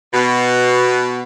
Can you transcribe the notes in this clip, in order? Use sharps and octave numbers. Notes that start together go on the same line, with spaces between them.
B2